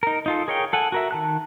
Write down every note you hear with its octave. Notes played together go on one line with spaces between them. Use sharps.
D#4 A#4
D#4 F4 A4
G#4 A#4 C#5 F5 G5
A4 F#5 G#5
F#4 A#4 E5
D#3 A5 F#6